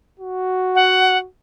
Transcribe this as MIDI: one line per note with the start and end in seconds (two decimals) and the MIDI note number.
0.20 1.26 66
0.75 1.17 78